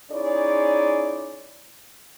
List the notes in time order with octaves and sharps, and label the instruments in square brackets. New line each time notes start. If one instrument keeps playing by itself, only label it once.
[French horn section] C#4 D#4 E4 G#4 C#5 D5